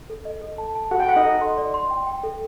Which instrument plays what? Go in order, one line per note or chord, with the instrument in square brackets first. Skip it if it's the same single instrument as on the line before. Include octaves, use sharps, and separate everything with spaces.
[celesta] A4
D#5
A4
A5
A5
[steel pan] F#4 F#5 [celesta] A4
[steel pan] G5
[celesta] A4 [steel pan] F#5
[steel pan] D#4 D#5
[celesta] A4
C6
D5
C6
G5
G5
A4